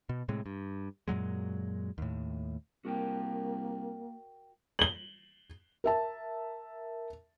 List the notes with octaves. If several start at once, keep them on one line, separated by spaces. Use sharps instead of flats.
B2
A2 C3 G#3
G2
F#2 A#2 F#3 G#3
D#2 A2
C2 A#3 F#4 A#4 G5
F#7 G7
A#4 E5 A5